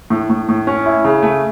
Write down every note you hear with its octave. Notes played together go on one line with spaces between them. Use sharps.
A2
A2
A2
C#4
E4
C#3
A3